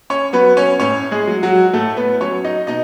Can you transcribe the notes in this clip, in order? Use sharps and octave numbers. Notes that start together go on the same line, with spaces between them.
C#4 C#5
F#3 B3 B4
C#4 C#5
A2 C#4 C#5
G#3 G#4
F#3
F#3 F#4
A2 A3 A4
B3 B4
F#3 C#4 C#5
D#4 D#5
B2 D#4 D#5